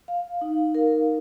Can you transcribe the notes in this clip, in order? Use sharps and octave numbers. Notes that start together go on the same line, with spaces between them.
F5
D#4
A#4